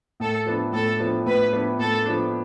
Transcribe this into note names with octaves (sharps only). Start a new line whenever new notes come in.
A2 A4
F3 B3 D4
A2 A4
F3 B3 D4
A2 B4
F3 B3 D4
A2 A4
F3 B3 D4